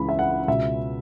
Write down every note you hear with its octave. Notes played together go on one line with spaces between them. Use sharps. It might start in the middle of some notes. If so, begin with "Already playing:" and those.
Already playing: C#2 C#3 E3 B5
E5
F#5
C#2 B2 E5